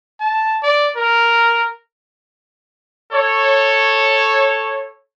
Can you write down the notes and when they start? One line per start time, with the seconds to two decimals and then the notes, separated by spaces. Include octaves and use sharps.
0.20 A5
0.63 D5
0.97 A#4
3.12 A4 C#5